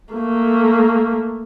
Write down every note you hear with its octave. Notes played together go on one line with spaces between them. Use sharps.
A3 A#3